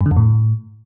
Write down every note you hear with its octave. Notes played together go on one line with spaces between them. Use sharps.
G2
D3
F2
A2